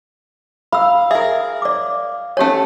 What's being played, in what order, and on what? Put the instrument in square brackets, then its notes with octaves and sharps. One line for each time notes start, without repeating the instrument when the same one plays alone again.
[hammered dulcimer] F5 [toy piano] B5 E6
[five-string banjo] G#4 A#4 [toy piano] E5
[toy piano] D5 D6
[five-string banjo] A3 G#5 [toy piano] C#4 G4 C#5